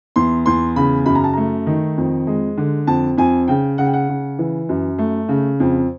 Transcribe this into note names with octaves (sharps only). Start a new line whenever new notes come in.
E2 C6
E2 C6
C#3 B5
F#2 B5
A#5
A5
A3 A#5
D#3
F2
G#3
D3
F2 A5
F2 G#5
C#3 G5
C#3 F#5
G5
F#5
C#3
E3
F#2
A3
C#3
F2